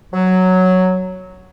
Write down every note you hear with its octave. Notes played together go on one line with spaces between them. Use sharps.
F#3